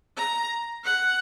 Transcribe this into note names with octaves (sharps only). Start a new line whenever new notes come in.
A#5
F#5